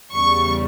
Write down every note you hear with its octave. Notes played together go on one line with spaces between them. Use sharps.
E2 C#3 G3 C#6